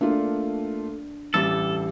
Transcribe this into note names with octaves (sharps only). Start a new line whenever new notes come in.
A3 A#3 D4 F4
A1 G3 A4 A6